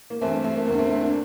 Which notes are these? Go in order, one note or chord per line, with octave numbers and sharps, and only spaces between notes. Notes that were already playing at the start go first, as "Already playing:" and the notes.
A#3
G2 E3 A3 C4
A3 C4
A#3
E2 D3 A#3
A3 C4
C4 E4
A#3 D4